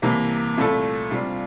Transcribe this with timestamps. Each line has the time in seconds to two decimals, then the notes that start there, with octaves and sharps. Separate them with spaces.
0.02 C2 C3 E3 A#3
0.58 C2 A#2 A3 E4 A4
1.11 C3 G3 D4 F4